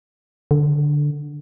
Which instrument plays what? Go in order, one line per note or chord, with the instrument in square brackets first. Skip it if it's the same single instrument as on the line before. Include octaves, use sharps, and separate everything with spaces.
[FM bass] D3